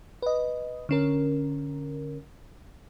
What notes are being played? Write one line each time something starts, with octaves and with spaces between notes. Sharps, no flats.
B4 D#5
D3 C#4 A#4